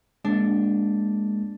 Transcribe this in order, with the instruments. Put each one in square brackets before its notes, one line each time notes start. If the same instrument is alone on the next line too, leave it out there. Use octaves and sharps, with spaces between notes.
[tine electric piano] G#3 A#3 [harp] D4